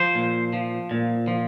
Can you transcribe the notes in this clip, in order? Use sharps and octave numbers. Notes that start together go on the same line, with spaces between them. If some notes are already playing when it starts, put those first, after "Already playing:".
Already playing: F3 C5
A#2
F3
A#2
F3